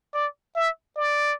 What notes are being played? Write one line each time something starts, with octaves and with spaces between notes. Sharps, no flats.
D5
E5
D5